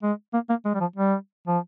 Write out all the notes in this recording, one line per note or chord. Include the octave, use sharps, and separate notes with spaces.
G#3
A#3
A#3
G#3
G3
F3
G3
F3